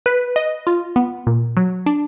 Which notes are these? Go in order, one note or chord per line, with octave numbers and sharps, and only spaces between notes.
B4
D#5
F4
B3
A#2
F#3
D4